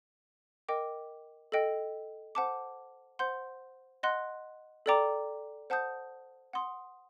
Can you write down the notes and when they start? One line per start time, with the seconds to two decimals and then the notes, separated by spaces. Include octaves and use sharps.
0.68 A#4 D#5 G5 D6
1.52 A4 D#5 G5
2.35 C5 F#5 A5 D6
3.19 C5 F#5 C6 G6
4.03 D#5 F#5 C6 F#6
4.86 A4 D5 G5 A#5 D6
5.70 C5 F#5 A5 D#6 G6
6.53 F#5 C6 D#6